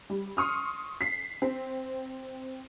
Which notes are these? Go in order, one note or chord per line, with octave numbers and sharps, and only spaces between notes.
G3
C6 C#6 D#6 F6
B6 C7
C4